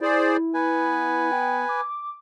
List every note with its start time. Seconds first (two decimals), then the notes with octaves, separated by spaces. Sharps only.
0.01 E4 G#4 C5 D5
0.54 B3 B4 G#5
1.32 G5
1.69 D6